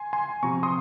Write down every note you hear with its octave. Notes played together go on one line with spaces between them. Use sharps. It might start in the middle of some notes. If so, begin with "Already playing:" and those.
Already playing: G#5 C6
G#5 C6
C3 F3 C4 A#5 C#6
C6 D#6